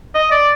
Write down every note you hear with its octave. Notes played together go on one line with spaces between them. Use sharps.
D#5
D5